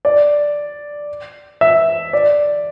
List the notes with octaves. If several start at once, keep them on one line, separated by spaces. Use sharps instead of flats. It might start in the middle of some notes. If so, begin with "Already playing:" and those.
D5
E5
D5